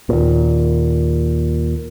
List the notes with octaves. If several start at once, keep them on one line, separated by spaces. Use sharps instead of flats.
D#2 A#2